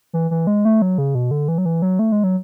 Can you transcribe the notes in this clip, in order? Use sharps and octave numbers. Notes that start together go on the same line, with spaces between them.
E3
E3
G#3
A3
F#3
C#3
B2
D3
E3
F#3
E3
F#3
A3
G#3
F#3